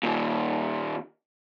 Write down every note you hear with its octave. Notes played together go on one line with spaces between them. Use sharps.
D#2 A#2